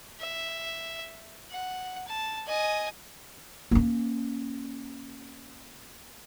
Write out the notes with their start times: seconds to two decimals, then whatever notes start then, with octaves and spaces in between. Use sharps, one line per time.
0.21 E5
1.51 F#5
2.08 A5
2.47 D#5 G#5
3.71 A#3 C#4